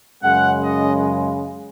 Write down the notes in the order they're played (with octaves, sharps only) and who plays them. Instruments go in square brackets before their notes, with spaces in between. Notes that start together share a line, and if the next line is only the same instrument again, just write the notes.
[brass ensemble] F#2 C#3 G#3 F#5
D#5